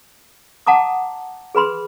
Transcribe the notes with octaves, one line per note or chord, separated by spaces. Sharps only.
F#5 A5 A#5 D6 D#6
G#4 B4 B5 C6